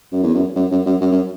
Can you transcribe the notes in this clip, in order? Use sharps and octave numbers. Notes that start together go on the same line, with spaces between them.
F#2
E2
F#2
F#2
F#2
F#2
F#2
F#2